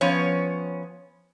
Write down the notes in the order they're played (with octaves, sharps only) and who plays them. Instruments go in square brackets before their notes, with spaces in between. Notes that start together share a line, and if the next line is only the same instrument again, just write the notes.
[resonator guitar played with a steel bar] F3 B3 C#4 C#5